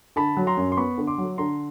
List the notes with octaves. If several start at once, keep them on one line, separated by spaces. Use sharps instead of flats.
D3 A5 B5
F#3
A#5 C6
F#2
C6
B3 B5 C#6
D3
C6 D6
F#3
D3 A#5 C6